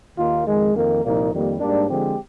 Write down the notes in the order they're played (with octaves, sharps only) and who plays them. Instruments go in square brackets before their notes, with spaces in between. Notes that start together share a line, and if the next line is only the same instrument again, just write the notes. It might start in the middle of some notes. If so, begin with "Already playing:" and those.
[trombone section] D#2 D#3 A#3 F4
F2 D#3 G#3
F2 D#3 A#3
C2 A#2 F3 A#3 D#4
F2 D#3 G3 A#3
G#2 G3 A#3 D4
D3 F3 G#3 C4 G4